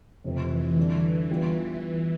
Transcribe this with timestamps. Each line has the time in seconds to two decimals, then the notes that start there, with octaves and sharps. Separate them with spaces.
0.24 F1 F2 C3 E3
0.77 D3 G3 D4
1.31 E3 G3 B3 F4